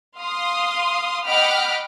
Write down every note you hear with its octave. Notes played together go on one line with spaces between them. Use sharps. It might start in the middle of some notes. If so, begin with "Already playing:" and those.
F5 C6 D#6
D#5 F#5 G5 B5 D6 F6